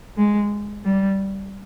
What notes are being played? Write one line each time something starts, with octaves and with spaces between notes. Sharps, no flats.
G#3
G3